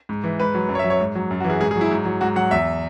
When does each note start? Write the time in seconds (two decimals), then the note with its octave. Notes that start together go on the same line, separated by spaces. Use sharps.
0.09 G#2
0.24 E3
0.40 G#2 B4
0.54 F#3
0.69 F#2
0.75 C#5
0.79 E5
0.84 F#3
0.90 C#5
1.00 G#2
1.15 F#3
1.31 F#2
1.40 F#4
1.45 E3
1.50 G#4
1.60 G#2 G#4
1.71 G#4
1.76 F#3
1.81 E4
1.91 G#2
2.05 F#3
2.21 G#2 F#4
2.36 F#3 F#5
2.51 E2 E5